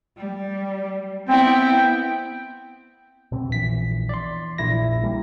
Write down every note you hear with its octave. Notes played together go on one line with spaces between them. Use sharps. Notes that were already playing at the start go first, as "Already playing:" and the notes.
G3
B3 C4 E4 G5
B2 C4
A#1 E2 E3 B6
D5 C6
A#1 E4 A#6
G3 A#3